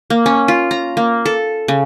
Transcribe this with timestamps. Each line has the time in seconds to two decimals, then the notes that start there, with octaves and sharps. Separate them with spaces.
0.10 A#3
0.26 C#4
0.48 F4
0.71 A#5
0.97 A#3
1.26 A4
1.68 C#3